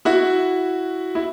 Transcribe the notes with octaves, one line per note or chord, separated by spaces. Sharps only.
E4 F#4
E4